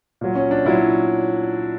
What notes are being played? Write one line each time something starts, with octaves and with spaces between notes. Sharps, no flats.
A#2 F#3
C#4
D4
A#2 F#3 E4